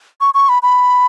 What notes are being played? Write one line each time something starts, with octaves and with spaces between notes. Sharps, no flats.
C#6
C#6
B5
B5